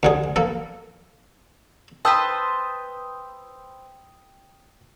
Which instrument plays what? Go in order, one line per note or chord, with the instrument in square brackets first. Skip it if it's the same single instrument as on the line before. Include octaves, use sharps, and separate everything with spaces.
[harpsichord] D2 D3 G#4
A#3 A4
[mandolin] B4 C5 A5 [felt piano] G5 D#6 E6